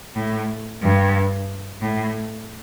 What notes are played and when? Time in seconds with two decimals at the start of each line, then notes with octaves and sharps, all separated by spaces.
0.16 A2
0.82 G2
1.82 A2